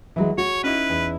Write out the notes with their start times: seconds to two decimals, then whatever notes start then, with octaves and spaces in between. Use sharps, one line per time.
0.16 E3 F#3 G#3
0.38 F#4 C#5
0.64 C#4 D#4 E4 B4
0.90 E2